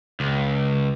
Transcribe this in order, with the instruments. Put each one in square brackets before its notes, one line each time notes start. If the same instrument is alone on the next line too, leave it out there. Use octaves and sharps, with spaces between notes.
[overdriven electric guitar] C#2